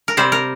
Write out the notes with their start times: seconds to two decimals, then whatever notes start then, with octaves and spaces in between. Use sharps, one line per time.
0.08 A#4
0.17 C3 G3 C5
0.32 A#4